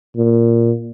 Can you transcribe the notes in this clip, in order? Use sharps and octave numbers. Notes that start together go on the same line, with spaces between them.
A#2